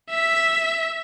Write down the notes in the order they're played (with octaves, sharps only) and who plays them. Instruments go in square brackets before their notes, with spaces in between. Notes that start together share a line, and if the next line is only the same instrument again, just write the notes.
[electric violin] E5 B6